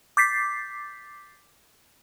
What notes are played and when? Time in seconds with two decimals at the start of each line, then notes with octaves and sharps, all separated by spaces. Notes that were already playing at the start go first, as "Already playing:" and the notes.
0.17 D6 G6 A6 B6 C7